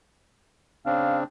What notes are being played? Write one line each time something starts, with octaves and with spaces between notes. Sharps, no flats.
C#3 C4 D4 F5